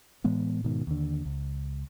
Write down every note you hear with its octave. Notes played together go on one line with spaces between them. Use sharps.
A2 E3 G#3 B3
G#2 B2 D#3
D#2 D3
C#2